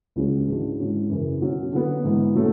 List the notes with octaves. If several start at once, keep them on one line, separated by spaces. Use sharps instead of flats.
C#2 C#3 F#3 C#4
G#2 E3 G#3 D4 F#4
G#2 F#3 C#4 E4
F#2 C#3 E3
B2 F#3 C#4
D3 F#3 B3
G#2 E3 B3
B2 F#3 A3 C#4